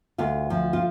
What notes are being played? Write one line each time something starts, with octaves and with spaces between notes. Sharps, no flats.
D2 F4
F3
F4